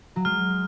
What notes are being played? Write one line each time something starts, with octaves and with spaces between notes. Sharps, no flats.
F#3
G#3 F6